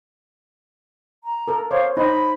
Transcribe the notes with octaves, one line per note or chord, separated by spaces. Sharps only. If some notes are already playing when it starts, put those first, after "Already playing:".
A#5
A4 A#4
C5 C#5 F5
D#4 C5 D#5 B5